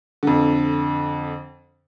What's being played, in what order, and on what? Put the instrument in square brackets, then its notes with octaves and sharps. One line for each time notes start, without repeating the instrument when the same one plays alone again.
[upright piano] F2 D3